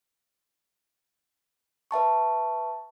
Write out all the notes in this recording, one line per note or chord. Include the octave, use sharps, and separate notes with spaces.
B4 E5 A5 C#6